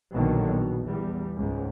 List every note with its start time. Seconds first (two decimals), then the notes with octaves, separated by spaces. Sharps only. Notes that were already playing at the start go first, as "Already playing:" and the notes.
0.13 A#1 B2 D3 D#3 F#3
0.45 B2
0.85 E2 G3
1.36 C#2 G#2